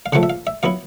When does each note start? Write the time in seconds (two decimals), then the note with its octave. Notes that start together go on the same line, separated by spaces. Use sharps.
0.06 F5
0.13 C#3 F3 A3 F#5
0.23 E5
0.30 F5
0.47 E5
0.63 F#3 B3 E4 F5